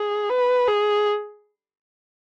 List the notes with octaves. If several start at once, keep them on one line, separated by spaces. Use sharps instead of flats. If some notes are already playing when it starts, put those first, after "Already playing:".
Already playing: G#4
B4
G#4